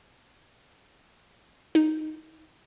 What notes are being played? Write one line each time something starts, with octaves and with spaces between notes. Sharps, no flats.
D#4